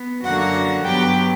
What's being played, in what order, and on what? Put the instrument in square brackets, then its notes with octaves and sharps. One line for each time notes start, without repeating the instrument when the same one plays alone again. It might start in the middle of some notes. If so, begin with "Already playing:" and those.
Already playing: [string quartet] B3
F#2 D3 A#3 F#4 F#5
G2 F#3 B3 G4 G5